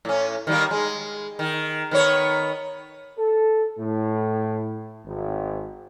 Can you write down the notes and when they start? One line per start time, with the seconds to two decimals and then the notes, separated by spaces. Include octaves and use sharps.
0.05 A2 C#4
0.47 D#3 G3 A#3
0.71 G#3
1.39 D#3
1.91 D#3 B3 C#5
3.18 A4
3.79 A2
5.06 G#1